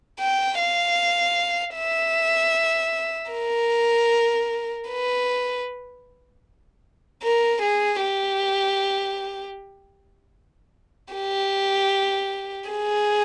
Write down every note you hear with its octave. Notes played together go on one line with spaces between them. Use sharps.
G5
F5
E5
A#4
B4
A#4
G#4
G4
G4
G#4